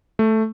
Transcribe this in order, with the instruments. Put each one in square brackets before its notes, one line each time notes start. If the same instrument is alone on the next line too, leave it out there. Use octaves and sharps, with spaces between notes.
[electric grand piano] A3